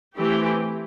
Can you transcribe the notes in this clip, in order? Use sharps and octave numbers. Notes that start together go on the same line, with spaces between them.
E3 A3 C4 G4